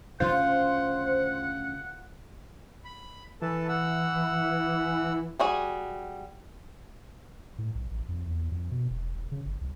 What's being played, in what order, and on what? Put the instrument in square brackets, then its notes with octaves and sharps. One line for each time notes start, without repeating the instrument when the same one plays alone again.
[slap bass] D2 C#3 C#4 [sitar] F4 [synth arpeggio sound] C5 [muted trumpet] F#5
[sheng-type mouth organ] B5
[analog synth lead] E3 [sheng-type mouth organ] A4 B4 A5
[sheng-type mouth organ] F#5 E6
[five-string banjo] G3 F#4 G#4
[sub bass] A2
B1
A1
F2
E2
F2
B2
E1
E1
C#3
G1
C2